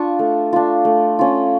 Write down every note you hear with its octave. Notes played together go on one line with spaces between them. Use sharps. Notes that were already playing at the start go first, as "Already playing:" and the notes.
Already playing: D4 F4 C#6
A3
D4 F4
A3
C#4 F4